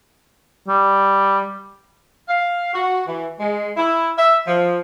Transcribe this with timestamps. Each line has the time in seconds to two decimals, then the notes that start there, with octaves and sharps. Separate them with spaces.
0.68 G3
2.29 F5
2.74 F#4
3.07 E3
3.40 G#3
3.77 E4
4.18 E5
4.47 F3